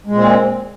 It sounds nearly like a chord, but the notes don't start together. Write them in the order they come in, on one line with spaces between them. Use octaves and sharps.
G#3 A#2 C4